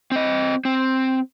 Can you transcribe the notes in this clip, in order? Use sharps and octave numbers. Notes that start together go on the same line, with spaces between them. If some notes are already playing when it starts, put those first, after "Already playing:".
C4 D#5
C4